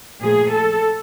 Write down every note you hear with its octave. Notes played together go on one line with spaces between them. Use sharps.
A#2 F3 A3 G#4
A4